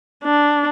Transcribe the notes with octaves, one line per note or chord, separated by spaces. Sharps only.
D4